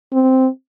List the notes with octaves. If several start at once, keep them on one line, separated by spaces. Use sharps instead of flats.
C4